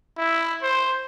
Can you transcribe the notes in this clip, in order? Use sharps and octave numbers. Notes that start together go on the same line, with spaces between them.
E4
C5